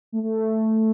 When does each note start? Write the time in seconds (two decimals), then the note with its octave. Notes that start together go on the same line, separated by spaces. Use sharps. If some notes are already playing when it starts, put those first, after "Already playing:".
0.12 A3
0.23 A3